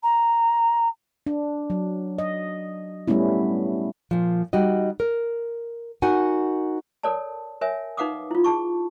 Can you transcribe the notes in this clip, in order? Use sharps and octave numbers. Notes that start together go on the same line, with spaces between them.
A#5
D4
F#3
D#5
G3 A3 B3 C#4 E4
A#2 F3
G3 D#4 F#4 D#5
A#4
D#4 F#4 A#4 F#5 G#5
A4 A#4 C#5 D5 A5
A#4 C#5 E5 G#5
D#4 B4 F5 F#5 D6 D#6
E4 F4
G#4 A5 C#6